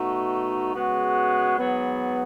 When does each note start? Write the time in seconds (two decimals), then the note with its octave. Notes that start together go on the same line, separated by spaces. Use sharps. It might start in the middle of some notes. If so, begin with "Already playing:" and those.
Already playing: B2 A3 D#4 F#4
0.73 C#3 G#3 B3 F#4
1.58 G#2 F#3 B3